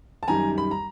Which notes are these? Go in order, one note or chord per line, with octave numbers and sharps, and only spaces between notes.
A5
F#2 D#3 G3 G#5 A#5
B5
A#5